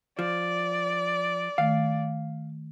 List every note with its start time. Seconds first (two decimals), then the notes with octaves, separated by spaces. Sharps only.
0.19 F3 D5
1.58 D#3 A3 F5